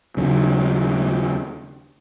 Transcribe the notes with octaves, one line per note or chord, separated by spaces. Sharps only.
D#2 C#3 F#3